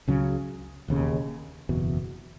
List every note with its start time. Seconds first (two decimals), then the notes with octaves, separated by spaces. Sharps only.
0.07 C#2 C#3 F#3
0.88 E1 D#2 C#3
1.69 F#1 E2 B2